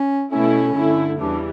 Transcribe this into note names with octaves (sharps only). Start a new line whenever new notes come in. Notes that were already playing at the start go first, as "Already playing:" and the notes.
Already playing: C#4
B2 A3 C#4 E4
G2 D3 A3 E4
E2 C#3 E3 G3 D4